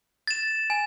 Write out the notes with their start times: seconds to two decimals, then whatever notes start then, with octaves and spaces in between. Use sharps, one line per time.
0.27 A6 E7
0.70 G#5